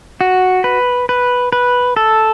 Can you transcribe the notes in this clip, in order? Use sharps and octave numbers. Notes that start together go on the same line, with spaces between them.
F#4
B4
B4
B4
A4